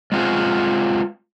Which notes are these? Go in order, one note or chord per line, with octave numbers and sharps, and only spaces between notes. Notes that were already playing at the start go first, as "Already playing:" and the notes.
G#3 C4 F4 F#4 G#4